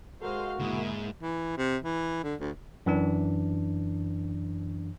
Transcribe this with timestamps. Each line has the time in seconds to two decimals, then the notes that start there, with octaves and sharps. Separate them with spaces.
0.22 G#3 F#4 A4 A#4 C5 F5
0.59 C#2 G#2 B2 D3 A#3 E4 G#4
1.22 E3
1.58 C3
1.84 E3
2.23 D3
2.40 D2
2.86 F#2 E3 D4